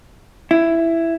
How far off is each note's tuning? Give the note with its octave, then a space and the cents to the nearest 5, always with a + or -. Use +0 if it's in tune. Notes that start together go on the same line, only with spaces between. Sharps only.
E4 +10